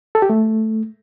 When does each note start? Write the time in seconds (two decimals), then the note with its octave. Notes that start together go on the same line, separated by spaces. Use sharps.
0.15 A4
0.22 G4
0.30 A3